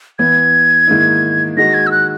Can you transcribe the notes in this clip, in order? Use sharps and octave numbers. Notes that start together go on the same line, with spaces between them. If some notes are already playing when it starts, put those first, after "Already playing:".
E3 B3 E4 G#6
G#2 D#3 A#3 E4
D#3 G#3 D#4 F#4 A#6
G#6
E6
F#6